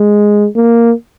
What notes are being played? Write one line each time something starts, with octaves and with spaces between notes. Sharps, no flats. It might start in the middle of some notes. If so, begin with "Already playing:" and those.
Already playing: G#3
A#3